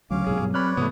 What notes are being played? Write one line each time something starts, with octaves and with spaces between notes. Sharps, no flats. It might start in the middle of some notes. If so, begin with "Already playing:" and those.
D2 C#3 F#3 C#4 F5 D6
B1 G#2 C3 G#4
G2 B2 G3
C4 B4 C#5 D5 B5 F6 F#6
G#2 C3 E3 A3 B3 D#6